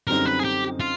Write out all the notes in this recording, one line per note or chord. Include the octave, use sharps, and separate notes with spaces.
F#2 D3 G3 C4 D#4 A#4
B4
G#4
G4
F4